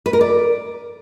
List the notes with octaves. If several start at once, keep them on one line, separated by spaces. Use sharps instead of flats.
B4
A#4
D5